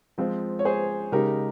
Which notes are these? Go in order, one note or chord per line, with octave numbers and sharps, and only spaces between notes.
F3 G#3 C4 F4
C#5
G#4 C5
C#3 G#3 D#4 G4 A#4